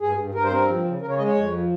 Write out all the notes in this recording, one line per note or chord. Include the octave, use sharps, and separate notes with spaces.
G2 G#4
G2
G2 A#4
C5
C4 A#4
F3
C#3
C#3 A#4
C#5
G#3 D#5
C#5
F2
F3